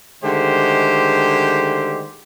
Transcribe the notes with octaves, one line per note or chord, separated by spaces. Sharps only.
D3 D#3 G#3 A3 G4 C5